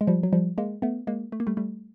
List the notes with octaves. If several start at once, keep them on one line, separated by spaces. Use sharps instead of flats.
G#3
F3 G3
F#3
F3 G3
G#3 A#3
A3 B3
G#3 A#3
A3
A#3
G3 A3
G3 A3